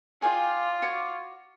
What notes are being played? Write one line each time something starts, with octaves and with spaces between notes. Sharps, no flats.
F4 G#4 D5 G5
F#4 C#5 D6